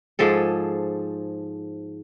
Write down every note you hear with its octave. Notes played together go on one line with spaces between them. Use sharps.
G#2 F3 G#4 A4